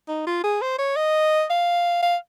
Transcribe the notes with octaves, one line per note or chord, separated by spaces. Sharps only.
D#4
F4
G#4
C5
C#5
D#5
F5
F5